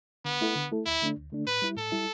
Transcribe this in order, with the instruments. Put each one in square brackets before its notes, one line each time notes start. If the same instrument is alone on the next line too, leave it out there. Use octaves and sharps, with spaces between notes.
[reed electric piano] D3 [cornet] B3
[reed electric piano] A3 E4 A4
D3
A3 E4 A4
[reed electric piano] D2 [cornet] E4
[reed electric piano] D3 A3 D4
D2
D3 A3 D4
[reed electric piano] A2 [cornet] B4
[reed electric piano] G3 E4
[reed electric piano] A2 [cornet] A4
[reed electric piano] G3 E4